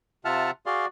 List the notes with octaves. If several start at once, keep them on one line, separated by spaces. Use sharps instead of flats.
C3 F4 E5 F#5 A5 F6
F#4 G#4 D5 F5 C6